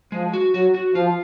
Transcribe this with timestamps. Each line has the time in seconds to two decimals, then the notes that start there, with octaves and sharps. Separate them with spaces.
0.12 F3 G#3
0.33 F#4
0.54 F#3 F#4
0.74 F#4
0.94 F3 F4